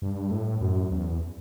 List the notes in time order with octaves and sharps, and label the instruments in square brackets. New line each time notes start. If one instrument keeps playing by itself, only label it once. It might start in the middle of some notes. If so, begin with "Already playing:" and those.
[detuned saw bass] G2
A2
F#2
E2